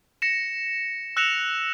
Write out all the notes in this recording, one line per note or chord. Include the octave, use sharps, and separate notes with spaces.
A#6 C#7 E7
E6 F#6 A#6 C#7 E7 F7